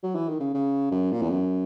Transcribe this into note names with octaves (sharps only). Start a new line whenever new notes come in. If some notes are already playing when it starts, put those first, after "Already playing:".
F#3
E3
D#3
C#3
C#3
F#2
A#2
E2
F#2